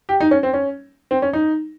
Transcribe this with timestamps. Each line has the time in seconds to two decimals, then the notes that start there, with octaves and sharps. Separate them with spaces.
0.09 G4
0.20 D#4
0.31 C#4
0.43 C4
0.53 C#4
1.11 C4
1.22 C#4
1.33 D#4